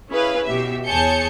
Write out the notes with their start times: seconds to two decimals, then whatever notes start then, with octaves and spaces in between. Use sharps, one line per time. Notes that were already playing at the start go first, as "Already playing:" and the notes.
0.10 C#4 E4 G#4 B4 F5
0.45 B2 G4 E5
0.86 E2 G#4 C#5 A5 G6 C#7